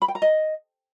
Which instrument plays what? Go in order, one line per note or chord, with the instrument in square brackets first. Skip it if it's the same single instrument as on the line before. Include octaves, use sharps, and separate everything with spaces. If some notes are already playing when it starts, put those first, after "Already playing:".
[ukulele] B5
G5
A#5
D#5